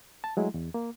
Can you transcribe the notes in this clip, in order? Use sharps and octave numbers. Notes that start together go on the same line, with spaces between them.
A5
F#3 G#3 A3 E4
E2
A#3